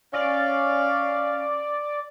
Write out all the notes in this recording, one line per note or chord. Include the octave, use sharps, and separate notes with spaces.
C#4 D5 F5